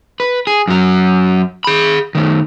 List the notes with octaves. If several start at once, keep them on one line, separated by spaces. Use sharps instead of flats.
B4
G#4
F#2 F#3
G#4 B5
D#3 A3